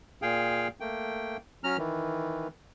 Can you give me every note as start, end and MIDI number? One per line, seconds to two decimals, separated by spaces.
0.22 0.68 46
0.22 0.68 68
0.22 0.68 77
0.22 0.68 79
0.80 1.37 57
0.80 1.37 58
0.80 1.37 79
1.64 1.77 54
1.64 1.77 61
1.64 1.77 82
1.64 1.77 89
1.78 2.48 51
1.78 2.48 52